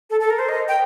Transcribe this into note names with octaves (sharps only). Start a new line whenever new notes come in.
A4
A4
A#4
C5
D#5
G5